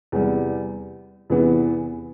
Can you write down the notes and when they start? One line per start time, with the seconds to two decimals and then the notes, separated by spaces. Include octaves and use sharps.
0.12 E2 C3 G3
1.30 E2 C3 E3 B3